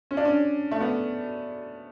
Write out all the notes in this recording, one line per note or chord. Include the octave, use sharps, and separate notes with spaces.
C#4
D4
C#4
A3
B3